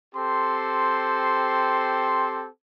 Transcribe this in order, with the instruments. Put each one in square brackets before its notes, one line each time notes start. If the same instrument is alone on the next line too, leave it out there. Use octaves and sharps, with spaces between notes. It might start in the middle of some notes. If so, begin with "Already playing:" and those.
[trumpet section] C4 G4 A4 C5 C6